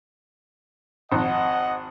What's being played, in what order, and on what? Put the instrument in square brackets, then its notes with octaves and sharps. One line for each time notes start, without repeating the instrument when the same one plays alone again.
[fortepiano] G#1 F2 [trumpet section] D#5 F#5